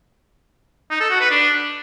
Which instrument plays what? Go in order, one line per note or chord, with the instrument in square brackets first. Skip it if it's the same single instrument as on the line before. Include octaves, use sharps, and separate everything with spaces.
[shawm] D#4
A4
F#4
B4
D4